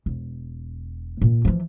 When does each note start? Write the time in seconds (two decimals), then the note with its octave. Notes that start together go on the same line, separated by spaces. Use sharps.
0.06 E1
1.21 A#2
1.45 E3 F3